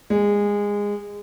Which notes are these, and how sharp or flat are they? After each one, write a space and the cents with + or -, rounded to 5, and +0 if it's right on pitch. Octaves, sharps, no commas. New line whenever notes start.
G#3 -20